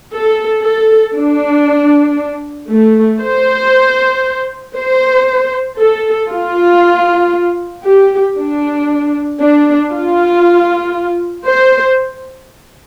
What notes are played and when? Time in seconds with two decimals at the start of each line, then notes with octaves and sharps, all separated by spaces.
0.12 A4
0.63 A4
1.14 D4
2.69 A3
3.21 C5
4.76 C5
5.79 A4
6.31 F4
7.84 G4
8.37 D4
9.39 D4
9.92 F4
11.46 C5